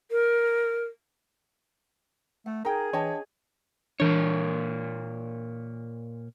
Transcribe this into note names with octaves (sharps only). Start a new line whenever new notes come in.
A#4
A3 F#5
D#4 G#4 A#4 G5 A#5
E3 D4 C#5 D#5 G5 A5
A#2 E3 D4 A#4 C#5